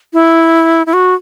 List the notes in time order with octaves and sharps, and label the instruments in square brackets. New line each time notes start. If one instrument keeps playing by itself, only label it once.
[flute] E4
E4
F#4